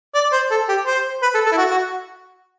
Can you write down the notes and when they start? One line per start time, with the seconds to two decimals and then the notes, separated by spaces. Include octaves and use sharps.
0.14 D5
0.32 C5
0.51 A4
0.69 G4
0.86 C5
1.22 B4
1.34 A4
1.46 A4
1.52 E4
1.58 F#4
1.71 F#4